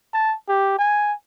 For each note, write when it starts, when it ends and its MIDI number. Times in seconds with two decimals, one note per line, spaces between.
0.14 0.35 81
0.49 0.78 67
0.79 1.13 80